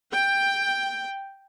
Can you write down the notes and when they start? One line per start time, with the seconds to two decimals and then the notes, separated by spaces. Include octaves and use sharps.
0.12 G5